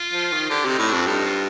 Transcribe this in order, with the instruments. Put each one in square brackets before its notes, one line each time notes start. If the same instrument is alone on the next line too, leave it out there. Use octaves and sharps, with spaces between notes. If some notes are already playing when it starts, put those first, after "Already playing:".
Already playing: [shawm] F4
[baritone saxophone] F3
D#3
[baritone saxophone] D3 [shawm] G4
[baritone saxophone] C3 [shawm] D#4
[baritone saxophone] A2
[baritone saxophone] F2 [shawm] D4
[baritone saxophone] G2 [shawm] D#4
[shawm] F4